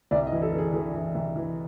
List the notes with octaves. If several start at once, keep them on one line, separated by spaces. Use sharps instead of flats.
C2 D5
D#5
E3
A4
E3
G#4
E3 G#4
E3
C2
E3